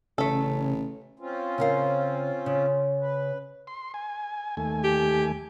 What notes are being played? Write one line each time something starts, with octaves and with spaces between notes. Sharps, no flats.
A1 C#3 A3 A4
C4 C#4 F4
C#3 A#4 F5
C#3
B4
C6
G#5
D#2 A3 G#5
G4